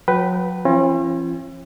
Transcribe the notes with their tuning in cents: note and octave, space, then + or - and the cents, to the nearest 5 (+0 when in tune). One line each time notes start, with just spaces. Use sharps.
F#3 -30 B4 +0 G5 -25
E3 +45 C#4 -45 F4 -45